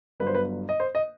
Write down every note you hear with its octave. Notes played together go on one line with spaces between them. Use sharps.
G1 G2 F#3 B3 B4
C5
B4
D#5
C5
D#5